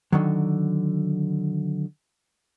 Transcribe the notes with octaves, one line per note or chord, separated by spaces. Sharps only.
D3 D#3 F#3